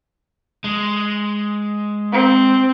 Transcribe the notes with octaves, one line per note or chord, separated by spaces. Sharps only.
G#3
C4